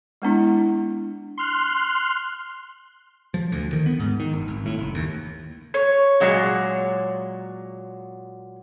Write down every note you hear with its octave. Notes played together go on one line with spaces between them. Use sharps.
G#3 B3 D4 E4
C6 F6 F#6
F3
D2
D#3
B3
G#2
D#3
G1
G#1
A2
F#1
D#2
C#5
A#2 F#3 G#3